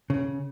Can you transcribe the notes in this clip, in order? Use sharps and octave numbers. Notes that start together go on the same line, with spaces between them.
C#3